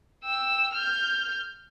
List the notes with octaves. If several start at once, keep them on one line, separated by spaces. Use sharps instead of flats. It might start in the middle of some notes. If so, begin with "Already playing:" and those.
G5 E6
F6 G6